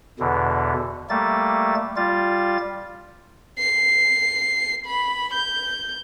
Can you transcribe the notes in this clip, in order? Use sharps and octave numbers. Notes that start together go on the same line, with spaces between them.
E2 B2 D3
G3 A3 A#3 A6
G3 F4 A6
C7
B5
G6